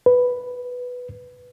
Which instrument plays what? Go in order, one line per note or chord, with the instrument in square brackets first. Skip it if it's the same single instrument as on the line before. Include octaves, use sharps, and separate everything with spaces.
[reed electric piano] B4